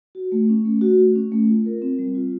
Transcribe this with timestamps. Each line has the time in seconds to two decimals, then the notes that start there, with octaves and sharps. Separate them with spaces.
0.15 F#4
0.32 A3
0.49 C#4
0.65 A3
0.81 F#4
0.98 A3
1.15 C#4
1.32 A3
1.49 F4
1.66 A#4
1.82 C4
1.99 G3
2.15 F4